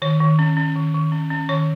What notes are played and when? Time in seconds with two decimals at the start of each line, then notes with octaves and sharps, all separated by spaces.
0.02 D#3 C#5
0.20 D#3
0.39 C#4
0.57 C#4
0.76 D#3
0.94 D#3
1.12 C#4
1.30 C#4
1.49 D#3 C#5